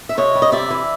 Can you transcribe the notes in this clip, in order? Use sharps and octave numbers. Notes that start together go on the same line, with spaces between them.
E5
C3 C#5 D#5
G3
D#5
C3 D5 E5
E3